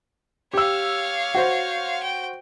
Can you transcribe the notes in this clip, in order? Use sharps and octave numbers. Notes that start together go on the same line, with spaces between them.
G4 C#5 F5 E6
F#4 C5
G5